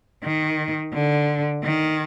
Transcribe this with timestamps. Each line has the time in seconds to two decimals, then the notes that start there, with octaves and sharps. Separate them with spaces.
0.23 D#3
0.93 D3
1.64 D#3